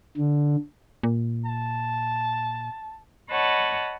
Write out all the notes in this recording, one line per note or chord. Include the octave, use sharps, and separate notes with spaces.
D3
A#2
A5
C#5 D#5 F#5 A5 B5